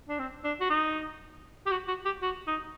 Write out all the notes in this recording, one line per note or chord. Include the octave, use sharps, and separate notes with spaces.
D4
C4
D4
F#4
D#4
G4
F#4
F#4
G4
F#4
D#4